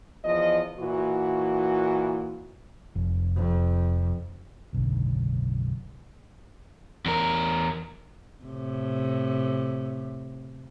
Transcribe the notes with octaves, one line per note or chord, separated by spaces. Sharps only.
E2 F3 D#5
A#2 E3 F#4
F1
F2
F#1 B1 G#2 D3
E2 A#4
A2 C3